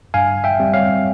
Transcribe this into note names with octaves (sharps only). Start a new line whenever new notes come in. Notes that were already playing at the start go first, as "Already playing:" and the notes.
G2 F5 G#5
E5 G5
G3 C4
C#5 F5